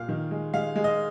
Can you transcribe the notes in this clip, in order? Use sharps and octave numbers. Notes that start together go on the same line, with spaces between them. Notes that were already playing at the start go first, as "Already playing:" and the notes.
Already playing: A#2 F5
D#3
G#3
G#3 F5
G#3
D#5